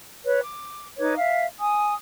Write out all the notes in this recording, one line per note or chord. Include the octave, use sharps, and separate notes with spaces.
B4 C#5
D6
D#4 B4 C#5 D6
E5 F5
G#5 D#6